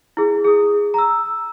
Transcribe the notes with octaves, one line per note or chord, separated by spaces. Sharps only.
E4 G#4
G#4 D#6
A#5 E6